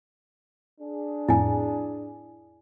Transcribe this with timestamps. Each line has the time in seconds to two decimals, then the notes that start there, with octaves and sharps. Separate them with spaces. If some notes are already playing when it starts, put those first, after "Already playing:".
0.80 D4 G#4
1.28 F2 A2 E4 G#5